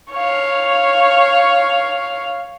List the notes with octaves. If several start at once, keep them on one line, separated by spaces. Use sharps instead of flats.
C#5 F5